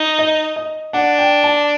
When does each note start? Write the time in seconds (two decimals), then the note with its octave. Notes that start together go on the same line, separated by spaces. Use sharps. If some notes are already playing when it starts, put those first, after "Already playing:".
Already playing: D#4
0.19 D#5
0.56 D#5
0.93 D4 F#5
1.19 G5
1.43 A5